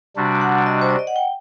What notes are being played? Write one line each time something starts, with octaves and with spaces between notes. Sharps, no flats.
C3 G3 D4 F#4
F#5
D#5
C5
D5
D#5
F#5
G5